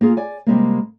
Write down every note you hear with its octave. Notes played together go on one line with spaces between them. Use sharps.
A#3 F4 G#4
D5 G#5
C3 G3 G#3 A#3